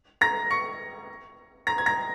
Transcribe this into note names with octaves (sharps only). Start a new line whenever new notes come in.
A#5 A#6
C#6 C#7
A#5 A#6
G#6
A#5 A#6